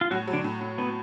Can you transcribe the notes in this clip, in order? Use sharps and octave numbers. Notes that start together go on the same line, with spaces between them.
F4
A2 F#3 F#4
F#3
D3 D4
A2
A2
A2 B3